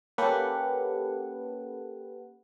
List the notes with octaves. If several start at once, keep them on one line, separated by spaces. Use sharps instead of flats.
A#3 C#4 G4 A4 B4 F#5